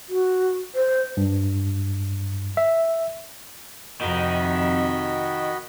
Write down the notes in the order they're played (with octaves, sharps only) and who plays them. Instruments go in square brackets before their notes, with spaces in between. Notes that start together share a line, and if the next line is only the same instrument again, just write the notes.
[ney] F#4
C5
[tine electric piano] G2
E5
[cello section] F2 C3 [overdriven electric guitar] D#3 [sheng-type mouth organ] F#4 D#5 B5